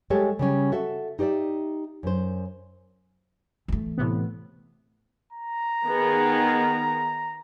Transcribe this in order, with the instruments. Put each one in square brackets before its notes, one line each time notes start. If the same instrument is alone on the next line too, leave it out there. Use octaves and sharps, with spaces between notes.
[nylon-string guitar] G3 G#3 G4 A4 C#5
C#3 G3 C#4
F#4 A4 E5
D#4 G4 C5 D5 E5
F#2 C5
[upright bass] E3 A3
[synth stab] A2 C3 B3
[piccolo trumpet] A#5
[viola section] D#3 B3 G#4